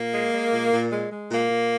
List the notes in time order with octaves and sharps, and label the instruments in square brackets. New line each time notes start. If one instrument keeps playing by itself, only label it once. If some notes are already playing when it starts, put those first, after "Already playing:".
Already playing: [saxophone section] A#2 A#3
G#3
G#3
A#2
A#2
G#3
G#3
A#2 A#3
A#2